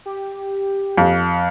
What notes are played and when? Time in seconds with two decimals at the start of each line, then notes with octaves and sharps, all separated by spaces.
0.06 G4
0.98 F2